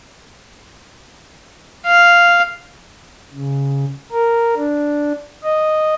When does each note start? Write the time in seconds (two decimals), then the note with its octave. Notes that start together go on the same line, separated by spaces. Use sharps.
1.86 F5
3.34 C#3
4.12 A#4
4.56 D4
5.43 D#5